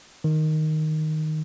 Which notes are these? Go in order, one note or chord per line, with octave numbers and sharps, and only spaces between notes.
D#3